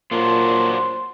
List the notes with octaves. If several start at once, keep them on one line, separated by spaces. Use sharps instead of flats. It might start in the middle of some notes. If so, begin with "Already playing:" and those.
A#2 F#3 D4 F4 C5